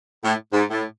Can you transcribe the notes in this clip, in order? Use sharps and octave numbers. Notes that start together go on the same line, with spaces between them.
A2
G#2
A2